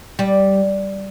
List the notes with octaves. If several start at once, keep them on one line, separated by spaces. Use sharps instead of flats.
G3